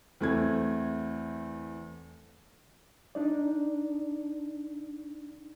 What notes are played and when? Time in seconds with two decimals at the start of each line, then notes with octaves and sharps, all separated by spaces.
0.21 E2 A3 C4 G#6
3.15 D4 D#4 D5